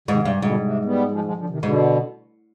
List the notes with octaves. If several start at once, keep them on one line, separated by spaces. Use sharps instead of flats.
G#2 C3 D#3
G2 C3
C3
G#2 B2 D3
C3
G3 B3
F3 G#3
F3 G#3
D3 F3
C3 D#3
G#2 B2 D3